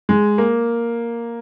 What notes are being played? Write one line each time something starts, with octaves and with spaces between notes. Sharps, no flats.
G#3
A#3